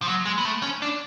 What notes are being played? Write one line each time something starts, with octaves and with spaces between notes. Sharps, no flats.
F3
F#3
G#3
B3
A3
C#4
D4